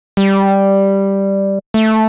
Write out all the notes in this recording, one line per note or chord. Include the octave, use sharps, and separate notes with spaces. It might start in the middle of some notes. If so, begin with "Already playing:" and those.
G3
A3